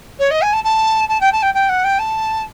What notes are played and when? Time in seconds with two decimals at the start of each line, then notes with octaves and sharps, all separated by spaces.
0.19 C#5
0.30 D#5
0.41 G#5
0.53 A5
0.64 A5
1.08 A5
1.20 G5
1.32 A5
1.42 G5
1.54 G5
1.69 F#5
1.84 G5
1.99 A5